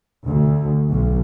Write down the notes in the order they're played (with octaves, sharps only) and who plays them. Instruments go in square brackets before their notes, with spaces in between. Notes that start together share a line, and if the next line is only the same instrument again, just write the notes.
[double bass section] D2
B1